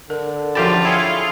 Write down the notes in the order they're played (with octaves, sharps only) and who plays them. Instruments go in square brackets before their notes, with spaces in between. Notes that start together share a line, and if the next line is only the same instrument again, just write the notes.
[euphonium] D3 [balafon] A#4
[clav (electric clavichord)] F#2 G4 A5 [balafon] F3 A4 B5 [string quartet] F4
[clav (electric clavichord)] E4 G#4 C#5 [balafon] G5